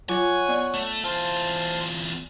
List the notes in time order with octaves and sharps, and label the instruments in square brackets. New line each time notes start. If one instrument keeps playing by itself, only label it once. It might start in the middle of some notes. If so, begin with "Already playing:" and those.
[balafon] F#3 F4 [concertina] C#5 F#5 [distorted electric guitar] G#5
[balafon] B3 D5
[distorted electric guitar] A3
[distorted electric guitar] E2 F4 [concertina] C5 A5